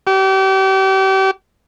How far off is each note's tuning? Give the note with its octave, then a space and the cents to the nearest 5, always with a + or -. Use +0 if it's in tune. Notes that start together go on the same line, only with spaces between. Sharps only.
G4 -35